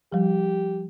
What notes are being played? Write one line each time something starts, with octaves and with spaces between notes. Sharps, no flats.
F3 G3 G4